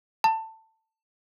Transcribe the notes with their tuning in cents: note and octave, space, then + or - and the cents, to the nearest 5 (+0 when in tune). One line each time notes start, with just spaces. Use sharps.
A5 +20